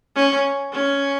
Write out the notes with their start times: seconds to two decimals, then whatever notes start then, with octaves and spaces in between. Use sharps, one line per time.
0.16 C#4
0.72 C#4